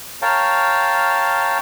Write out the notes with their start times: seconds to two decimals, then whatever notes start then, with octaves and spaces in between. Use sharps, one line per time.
0.22 A#4 C#5 F5 G5 A5